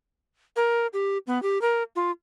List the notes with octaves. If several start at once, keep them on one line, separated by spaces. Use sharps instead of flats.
A#4
G4
B3
G4
A#4
F4